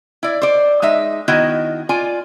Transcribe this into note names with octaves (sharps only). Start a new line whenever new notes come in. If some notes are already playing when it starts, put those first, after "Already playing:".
E4 D5
C5 D5
G#3 D#4 E5
D#3 B3 E4 F#4 D#5
F4 D5 G#5